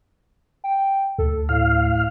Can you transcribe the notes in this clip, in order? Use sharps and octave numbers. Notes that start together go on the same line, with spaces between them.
G5
D2 A4
A2 F5